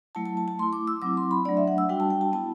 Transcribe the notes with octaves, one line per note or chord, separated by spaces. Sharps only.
F#3 A3 E4 A5
A5
A5
A5
A3 E4 C6
D6
E6
F#3 C4 E4 D6
C6
B5
F#3 A3 D4 D5
E5
F#5
E6
G3 D4 F#4 G5
A5
G5
A5
B3 E4 A5